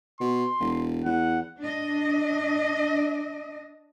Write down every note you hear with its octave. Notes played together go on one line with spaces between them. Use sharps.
B2 C6
E1
E2 F#5
D4 D#5